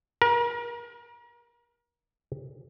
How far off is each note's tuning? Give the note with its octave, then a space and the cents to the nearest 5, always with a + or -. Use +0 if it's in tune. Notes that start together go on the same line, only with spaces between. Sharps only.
A#4 +35